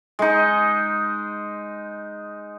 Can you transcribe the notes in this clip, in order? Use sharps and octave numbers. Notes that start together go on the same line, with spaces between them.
G#3 D#4